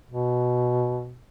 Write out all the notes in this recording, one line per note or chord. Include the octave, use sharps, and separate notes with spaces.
B2